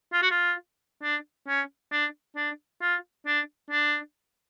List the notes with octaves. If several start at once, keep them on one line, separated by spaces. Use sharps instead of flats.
F4
F#4
F4
D4
C#4
D4
D4
F4
D4
D4